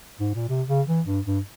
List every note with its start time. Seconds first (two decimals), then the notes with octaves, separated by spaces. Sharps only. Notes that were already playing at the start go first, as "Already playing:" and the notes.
0.20 G#2
0.34 A#2
0.49 C3
0.68 C#3
0.87 E3
1.06 G2
1.26 G2